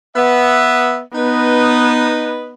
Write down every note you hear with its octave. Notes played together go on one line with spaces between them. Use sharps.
B3 E5
B3 D#4 B4 D#5